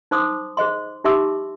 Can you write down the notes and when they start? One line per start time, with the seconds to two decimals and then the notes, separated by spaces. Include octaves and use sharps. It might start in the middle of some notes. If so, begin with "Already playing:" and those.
0.11 D#4 C5 C6 D6 D#6
0.57 G#4 C5 D#5 C6
1.04 D#4 G4 E5 C6 D6 E6